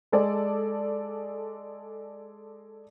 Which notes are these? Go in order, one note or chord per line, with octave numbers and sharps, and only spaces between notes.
G#3 A4 D5